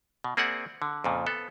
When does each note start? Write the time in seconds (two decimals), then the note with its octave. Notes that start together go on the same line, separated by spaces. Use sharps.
0.24 B2
0.37 A#3 C4 G#4 D5 E5 F#5
0.82 D3
1.04 F2 A#2 C#3
1.26 B3 A4